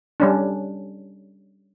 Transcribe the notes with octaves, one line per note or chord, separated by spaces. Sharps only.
G3 C#4 D4